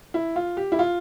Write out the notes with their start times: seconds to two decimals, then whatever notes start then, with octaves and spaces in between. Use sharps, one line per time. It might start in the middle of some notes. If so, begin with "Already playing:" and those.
0.14 E4
0.36 F4
0.57 G4
0.72 E4
0.79 F4